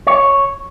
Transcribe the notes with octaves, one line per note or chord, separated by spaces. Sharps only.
C#5